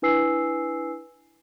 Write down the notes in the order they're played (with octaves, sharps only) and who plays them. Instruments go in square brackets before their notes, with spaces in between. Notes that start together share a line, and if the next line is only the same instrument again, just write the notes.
[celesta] D4 E4 B4 G#5 E6 C7